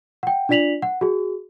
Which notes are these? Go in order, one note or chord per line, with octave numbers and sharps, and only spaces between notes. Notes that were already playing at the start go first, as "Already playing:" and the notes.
F#5 G5
D4 F4 D5 B6 F7 F#7
F#5
F#4 G#4